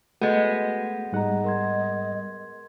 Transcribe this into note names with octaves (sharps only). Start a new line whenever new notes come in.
G#3 A3 B3 F#4 G6 A6
G#2 G3 D#4 G#4 D#5 F#5 A#5
A#4 C6 G#6